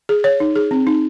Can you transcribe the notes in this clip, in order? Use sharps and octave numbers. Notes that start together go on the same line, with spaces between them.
G#4
C#5
D#4
G#4
C4
D#4